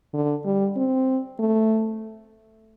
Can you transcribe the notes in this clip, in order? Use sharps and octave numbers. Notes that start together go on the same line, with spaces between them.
D3
G3
C4
A3